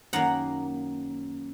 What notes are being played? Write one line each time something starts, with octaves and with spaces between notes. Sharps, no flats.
F#2 D#3 A#3 F#5 A#5